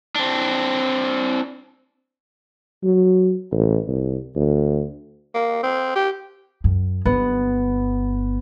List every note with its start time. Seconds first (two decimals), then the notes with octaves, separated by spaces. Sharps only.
0.15 C4 D4
2.83 F#3
3.52 A1
3.88 C2
4.35 D2
5.34 A#3
5.63 C4
5.95 G4
6.64 F#2
7.05 G1 B3